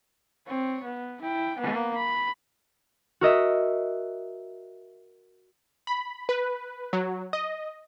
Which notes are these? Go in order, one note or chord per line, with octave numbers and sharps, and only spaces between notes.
C4 C#5
B3
E4 G5
A#3 B3
B5
F#4 A#4 D#5 E5
B5
B4
F#3
D#5